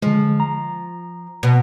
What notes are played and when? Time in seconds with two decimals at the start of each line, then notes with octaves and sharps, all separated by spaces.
0.02 D3 F3 G#3
0.40 A#5
1.43 B2